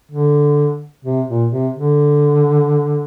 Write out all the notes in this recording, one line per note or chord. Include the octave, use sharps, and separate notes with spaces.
D3
C3
A#2
C3
D3